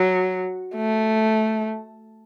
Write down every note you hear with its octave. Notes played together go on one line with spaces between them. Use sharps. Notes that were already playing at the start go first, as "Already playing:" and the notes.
Already playing: F#3
A3